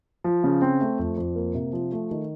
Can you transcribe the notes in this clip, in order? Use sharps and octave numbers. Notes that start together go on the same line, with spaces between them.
F3
C#3
C4
A3
F2
F2
A#3
C3
F3
A3
D#3